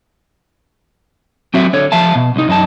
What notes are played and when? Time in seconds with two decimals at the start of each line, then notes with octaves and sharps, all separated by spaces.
1.54 F#3 C4 F#4 E5
1.73 D3 C#5
1.92 F3 E5 F5 A5
2.15 B2
2.36 C2 D#4
2.48 F#2 D#4 A5